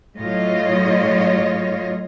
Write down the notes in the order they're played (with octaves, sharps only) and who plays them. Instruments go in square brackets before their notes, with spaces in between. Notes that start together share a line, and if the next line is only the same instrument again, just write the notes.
[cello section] A2 F#3 F4 C#5 D#5